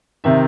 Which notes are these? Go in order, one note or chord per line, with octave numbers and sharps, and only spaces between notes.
C3 D#3 E5